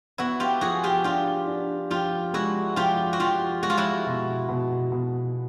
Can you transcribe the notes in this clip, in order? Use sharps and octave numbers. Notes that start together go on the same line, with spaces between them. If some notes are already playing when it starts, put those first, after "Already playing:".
B3 E4 F#4
F4 G4
F3 F#4 G#4
F4 G4
D4 F4 G4
D4
F3 F4 G4
G#3 E4 F#4
F3 F4 G4
F#4
F3 F4 G4
G#3 F#4
F4
E4 F#4
B2
B2
B2